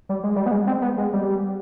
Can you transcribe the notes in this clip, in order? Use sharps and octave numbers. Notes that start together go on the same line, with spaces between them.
G3
G#3
G3
B3
G#3
C4
B3
G#3
G3